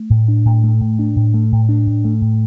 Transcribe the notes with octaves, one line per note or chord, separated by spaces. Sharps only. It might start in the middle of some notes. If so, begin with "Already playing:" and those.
Already playing: A3
A2
D4
A2
A3
A2
D4
A2
A3
A2
D4
A2
A3
A2